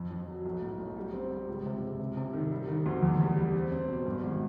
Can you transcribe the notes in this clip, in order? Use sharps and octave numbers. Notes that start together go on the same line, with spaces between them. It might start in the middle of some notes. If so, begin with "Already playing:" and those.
Already playing: F2
F2
F#3
B1
A2
B1
G3
C4
G3
C#2
C3
C#2
C3
C3
D#3
G3
D#3
D2
E2
G3
G3
C4
C4
B2
G2
G#1